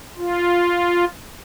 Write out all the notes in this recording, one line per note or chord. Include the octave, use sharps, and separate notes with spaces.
F4